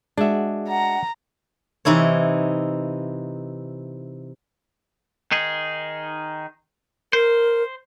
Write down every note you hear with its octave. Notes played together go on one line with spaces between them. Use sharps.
G#3 D4 F#4 E5
F#5 A#5
C3 E3 D#4 E4 C#5
D#3 D#4 G#4
A#4 C5